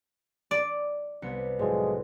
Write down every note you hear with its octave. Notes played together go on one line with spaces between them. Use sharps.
D5
C2 B3 C#7
A2 F3 F#3 G#3